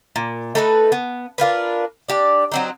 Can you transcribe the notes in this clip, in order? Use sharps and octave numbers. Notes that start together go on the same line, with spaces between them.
A#2
A3 D#4 A4 B4
B3
D4 F4 A#4 B4
D4 G4 D5
F#3 C4 D#4